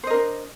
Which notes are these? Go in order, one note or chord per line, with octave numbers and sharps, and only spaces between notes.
D4 A#4 C5 D#5